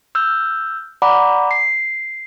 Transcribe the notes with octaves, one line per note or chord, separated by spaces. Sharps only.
E6 F6 G6
D5 F#5 A#5 B5 D6
C7